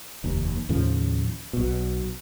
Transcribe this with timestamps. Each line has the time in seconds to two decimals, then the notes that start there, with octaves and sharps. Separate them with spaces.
0.24 F1 D#2
0.69 D#2 A2 C#3 F3
1.53 B1 B2